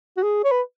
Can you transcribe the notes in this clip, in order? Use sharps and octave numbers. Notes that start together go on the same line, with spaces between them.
F#4
G#4
C#5
B4